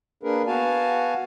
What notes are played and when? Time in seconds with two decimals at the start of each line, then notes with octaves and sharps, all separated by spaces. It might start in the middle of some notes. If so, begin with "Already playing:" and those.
0.23 A#3 D4 G#4 A#4 B4
0.47 B3 F#4 F5 G#5 A5